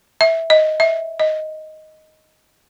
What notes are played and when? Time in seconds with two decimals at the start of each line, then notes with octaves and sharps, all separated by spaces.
0.21 E5
0.50 D#5
0.80 E5
1.20 D#5